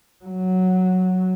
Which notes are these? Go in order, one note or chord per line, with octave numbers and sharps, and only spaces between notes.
F#3